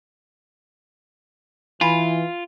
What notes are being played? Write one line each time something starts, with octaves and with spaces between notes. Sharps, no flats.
E3 F4 G#5 B5